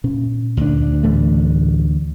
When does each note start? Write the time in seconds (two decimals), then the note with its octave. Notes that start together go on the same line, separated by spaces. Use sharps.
0.04 A#2 C#4
0.57 D2 D4
1.03 A2 E3 A3